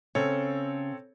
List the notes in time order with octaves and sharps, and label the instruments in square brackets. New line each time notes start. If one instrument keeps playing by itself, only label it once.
[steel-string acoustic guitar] C#3 [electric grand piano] C4 A4 C#5